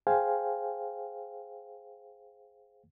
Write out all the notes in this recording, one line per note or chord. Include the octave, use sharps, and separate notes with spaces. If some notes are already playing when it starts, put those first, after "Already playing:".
G#4 C5 F5 G5 G#5